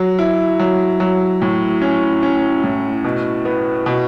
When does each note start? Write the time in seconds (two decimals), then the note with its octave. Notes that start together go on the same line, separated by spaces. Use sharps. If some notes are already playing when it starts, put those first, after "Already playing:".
Already playing: F#3
0.19 E4
0.59 F#3
1.00 F#3
1.42 A2
1.82 C#4
2.23 C#4
2.64 A2
3.04 B2
3.45 B3
3.86 B2